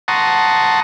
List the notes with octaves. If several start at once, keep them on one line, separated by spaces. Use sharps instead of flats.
F#5 A5 A#5 C6 C#6 D#6